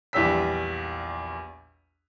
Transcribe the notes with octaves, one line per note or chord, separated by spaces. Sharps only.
A#1 E2 G3 G5 E6 B6